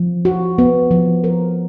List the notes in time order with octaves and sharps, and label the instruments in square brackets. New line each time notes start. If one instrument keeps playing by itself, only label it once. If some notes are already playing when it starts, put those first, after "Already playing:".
Already playing: [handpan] F3
F#4
B3
F3
A#4